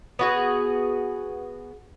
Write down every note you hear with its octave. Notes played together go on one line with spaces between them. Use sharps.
B3 F#4 G#4